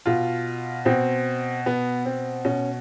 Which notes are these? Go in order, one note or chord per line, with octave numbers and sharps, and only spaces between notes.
B2 F4
B2 C4
B2 B3
C4
B2 C#4